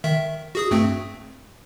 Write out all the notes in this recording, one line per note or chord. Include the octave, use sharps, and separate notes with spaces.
D#3 E5
F#4 G#4 D#6
G2 A3 C4